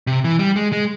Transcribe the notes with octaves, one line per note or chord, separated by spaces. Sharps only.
C3
E3
G3
G#3
G#3